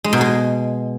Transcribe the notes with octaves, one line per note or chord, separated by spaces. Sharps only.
G#3
B2
G#3